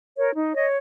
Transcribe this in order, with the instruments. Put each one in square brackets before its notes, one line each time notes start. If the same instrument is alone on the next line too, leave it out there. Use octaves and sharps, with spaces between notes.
[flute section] A#4 C#5
D#4
C#5 D#5